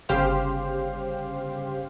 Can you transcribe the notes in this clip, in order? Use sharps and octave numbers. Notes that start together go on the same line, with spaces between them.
G1 C#3 G4 C5 F5